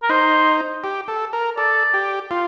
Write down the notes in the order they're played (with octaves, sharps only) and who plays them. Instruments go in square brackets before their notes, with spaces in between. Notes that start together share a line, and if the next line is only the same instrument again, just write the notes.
[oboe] A#4
[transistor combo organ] D#4 [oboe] C5
[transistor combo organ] G4
A4
A#4
[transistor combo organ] A4 [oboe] D5
[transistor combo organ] G4
F4